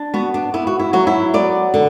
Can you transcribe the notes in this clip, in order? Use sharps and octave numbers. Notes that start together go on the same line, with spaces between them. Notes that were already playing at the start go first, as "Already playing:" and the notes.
Already playing: D4
B3 F#4
D4
B3 E4
F#4
E4
F#3 F#4
E4
B3 D5
D3